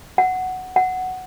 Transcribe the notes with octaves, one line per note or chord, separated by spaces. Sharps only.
F#5
F#5